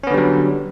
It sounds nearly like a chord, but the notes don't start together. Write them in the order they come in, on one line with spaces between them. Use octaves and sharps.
C#4 B3 D3 G3 F#3